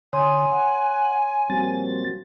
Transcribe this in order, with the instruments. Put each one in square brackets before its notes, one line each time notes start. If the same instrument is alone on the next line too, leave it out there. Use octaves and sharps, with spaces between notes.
[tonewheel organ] D3 D#6 [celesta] C#5 C6 [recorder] G#5
[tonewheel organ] F#5
[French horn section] A#2 F3 F#4 [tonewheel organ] G3 C4 A6